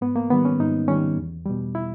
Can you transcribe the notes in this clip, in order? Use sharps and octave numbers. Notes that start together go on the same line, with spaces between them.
G#2 B3
A#3
D#3 G3 B3
C#4
G#2 D#4
D#3 G3 C#4
E2
B2 G3
E4